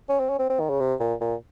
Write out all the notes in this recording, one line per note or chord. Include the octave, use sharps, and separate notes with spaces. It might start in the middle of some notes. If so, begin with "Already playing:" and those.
C#4
C4
C#4
C4
C4
D#3
C#3
C3
A#2
A#2